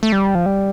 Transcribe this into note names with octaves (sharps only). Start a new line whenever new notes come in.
A3
G3
F3
G3